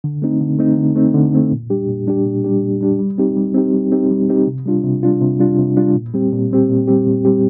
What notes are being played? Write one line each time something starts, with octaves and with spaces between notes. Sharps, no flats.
D3
A3 C4 D#4
D3
A3 C4 D#4
D3
A3 C4 D#4
D3
A3 C4 D#4
A#2
G3 D4 G4
A#2
G3 D4 G4
A#2
G3 D4 G4
A#2
G3 D4 G4
G3
C4 D#4 G4
G3
C4 D#4 G4
G3
C4 D#4 G4
G3
C4 D#4 G4
C3
G3 D4 F4
C3
G3 D4 F4
C3
G3 D4 F4
C3
G3 D4 F4
A#2
G3 C4 G4
A#2
G3 C4 G4
A#2
G3 C4 G4
A#2
G3 C4 G4